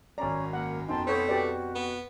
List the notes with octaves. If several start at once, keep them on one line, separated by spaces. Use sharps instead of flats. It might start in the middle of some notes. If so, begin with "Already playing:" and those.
G#1 F#2 C#4 D5 A#5
A#3 F#5
F2 B2 C4 D#4 A5 C6
A3 B3 C5 C#5
F#4 G4 B4 D5
B3